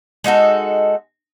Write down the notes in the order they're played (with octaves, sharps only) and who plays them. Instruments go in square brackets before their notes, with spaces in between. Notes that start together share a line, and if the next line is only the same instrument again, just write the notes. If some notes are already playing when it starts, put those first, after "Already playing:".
[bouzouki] G#3 D#4 F#4 A4